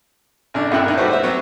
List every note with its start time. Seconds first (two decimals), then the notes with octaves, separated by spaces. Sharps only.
0.54 A1 C#3 D4
0.71 B1 F#2 A2 E4 G5 F#6
0.84 A#3 D#4
0.97 G3 A3 F#4 B4 C5
1.11 C5 E5
1.23 F#3 B3